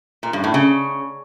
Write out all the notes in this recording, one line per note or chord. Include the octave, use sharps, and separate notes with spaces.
A#2
G2
A2
C#3